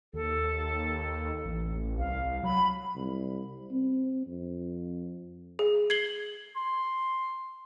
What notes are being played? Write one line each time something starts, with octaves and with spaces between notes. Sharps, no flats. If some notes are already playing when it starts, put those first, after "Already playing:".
D#2 A4
A1
C2 F5
F#3 B5
C2
C4
F2
G#4
G#6 C7 F#7 G7
C6